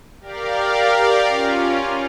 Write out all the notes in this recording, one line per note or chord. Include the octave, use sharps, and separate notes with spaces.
G4 A#4 D5 F5
C#4 F4